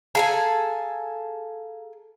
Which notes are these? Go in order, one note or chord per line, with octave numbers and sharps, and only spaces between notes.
G#4 A4 F5 G#5 A#5